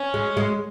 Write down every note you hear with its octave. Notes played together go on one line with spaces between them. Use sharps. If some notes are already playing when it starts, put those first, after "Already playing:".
Already playing: C#4
G#3
G#3